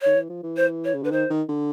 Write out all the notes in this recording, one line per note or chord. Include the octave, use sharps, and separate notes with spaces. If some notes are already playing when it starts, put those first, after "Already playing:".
D#3 C#5
E3
F3
E3
C5
C#5
C#3
D3 B4
D#3 C5
D#3
D3